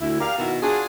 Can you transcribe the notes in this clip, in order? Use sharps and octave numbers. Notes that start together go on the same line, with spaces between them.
D2 E4
G4 A#4 D5 F5
B2 D#3 E4 F#4
D4 F4 F#4 G#4